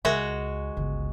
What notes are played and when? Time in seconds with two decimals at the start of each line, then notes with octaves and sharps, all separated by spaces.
0.05 C#2 G#3 F#4 A#4 E5
0.77 G1 C#2